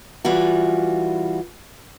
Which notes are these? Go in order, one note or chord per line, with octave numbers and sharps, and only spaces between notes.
E3 G3 F4 F#4